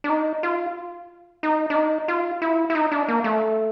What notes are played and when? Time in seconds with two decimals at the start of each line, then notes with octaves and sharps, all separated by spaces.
0.04 D4
0.10 D#4
0.43 F4
1.43 D#4
1.70 D4
1.75 D#4
2.08 F4
2.42 E4
2.70 E4
2.75 D#4
2.92 D4
3.08 A#3
3.24 A3